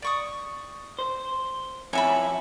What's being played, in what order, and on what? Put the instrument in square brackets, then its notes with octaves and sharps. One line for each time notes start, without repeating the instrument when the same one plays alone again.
[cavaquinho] D5 C#6 D#6
[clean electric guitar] C5
[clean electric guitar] F2 C#5 G#5 [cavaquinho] E4 E5 B5